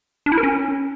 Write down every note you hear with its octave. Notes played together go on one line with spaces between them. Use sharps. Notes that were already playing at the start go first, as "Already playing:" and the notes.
D4
E4
A#4
C#4